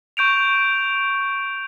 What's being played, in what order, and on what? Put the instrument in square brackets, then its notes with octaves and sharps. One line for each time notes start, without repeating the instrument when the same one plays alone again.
[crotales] C#6 G6 D7 F7